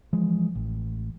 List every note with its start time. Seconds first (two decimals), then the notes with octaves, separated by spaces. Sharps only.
0.13 E3 F3 G#3
0.55 A1